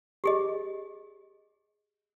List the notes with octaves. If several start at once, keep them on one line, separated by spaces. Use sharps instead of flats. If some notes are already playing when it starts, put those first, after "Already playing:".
G4 G#4 D#5